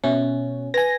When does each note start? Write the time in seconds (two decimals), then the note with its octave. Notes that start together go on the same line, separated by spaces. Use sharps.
0.04 B2 C#4 E5
0.74 B4 G#5 A#6